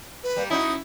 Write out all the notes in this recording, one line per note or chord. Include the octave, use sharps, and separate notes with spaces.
B4
G3 A#3
C#4 D#4 E4 F#4 D#6